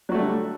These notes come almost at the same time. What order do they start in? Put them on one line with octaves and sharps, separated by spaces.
F#3 F#4 A3 G3 D3